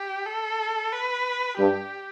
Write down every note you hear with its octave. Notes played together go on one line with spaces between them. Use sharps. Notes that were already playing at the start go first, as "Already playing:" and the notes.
Already playing: G4
A4
B4
G2 G4